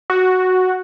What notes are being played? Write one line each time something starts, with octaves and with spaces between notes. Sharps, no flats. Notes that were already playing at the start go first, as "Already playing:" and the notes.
F#4